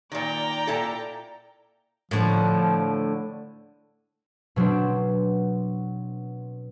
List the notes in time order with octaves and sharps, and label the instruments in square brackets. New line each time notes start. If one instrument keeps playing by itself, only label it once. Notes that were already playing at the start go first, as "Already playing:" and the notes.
[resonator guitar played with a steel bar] A#2 D#3 [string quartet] D5 G5 A#5
[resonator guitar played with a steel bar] A#2 E4 A4
[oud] A2 D3 [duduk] F3
[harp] B2 F#3 B3 C4 D4